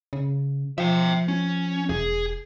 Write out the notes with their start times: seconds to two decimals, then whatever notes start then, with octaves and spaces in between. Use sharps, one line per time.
0.13 C#3
0.78 F3 E5 G5
1.28 C#4
1.89 E1 G#4